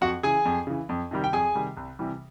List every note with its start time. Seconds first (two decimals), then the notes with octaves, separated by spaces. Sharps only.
0.01 F2 F#4 F#5
0.23 C#3 E3 G#4 G#5
0.45 F2
0.67 C#3 E3
0.89 F2
1.11 C3 D#3 G3
1.24 G5
1.33 F2 G#4 G#5
1.55 C3 D#3 G3
1.77 C2
1.99 C3 E3 G3